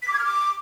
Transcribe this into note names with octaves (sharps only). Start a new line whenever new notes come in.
B6
D6
G#6
F6
D6